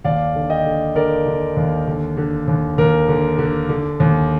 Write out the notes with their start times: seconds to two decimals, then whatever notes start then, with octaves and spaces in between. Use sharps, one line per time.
0.04 D#2 D5 F5
0.35 D3
0.50 D#5 G5
0.65 D3
0.95 D3 A#4 D5
1.26 D3
1.57 D#2
1.87 D3
2.17 D3
2.48 D#2
2.78 D#2 A#4
3.08 D3
3.38 D3
3.69 D3
4.00 D#2